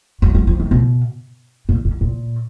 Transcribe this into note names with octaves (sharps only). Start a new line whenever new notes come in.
F#3
F#3
F3
D#3
B2
A#2
B2
A#2